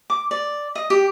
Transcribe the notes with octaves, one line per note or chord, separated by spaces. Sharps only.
D6
D5
D#5
G4